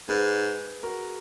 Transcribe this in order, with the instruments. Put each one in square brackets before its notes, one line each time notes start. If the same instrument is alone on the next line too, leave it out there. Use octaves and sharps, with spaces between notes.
[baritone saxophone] G#2 [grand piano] G#4 B4
[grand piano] F#4 A#4